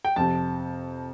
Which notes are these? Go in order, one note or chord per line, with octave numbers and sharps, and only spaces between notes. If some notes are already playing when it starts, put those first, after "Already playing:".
G5
F2 C3 A5